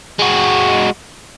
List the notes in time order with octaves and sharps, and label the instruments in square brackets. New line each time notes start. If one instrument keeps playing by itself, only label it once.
[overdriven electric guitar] G#3 F#4